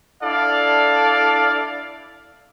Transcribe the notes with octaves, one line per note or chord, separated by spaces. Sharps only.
D4 E4 A4 D5 F5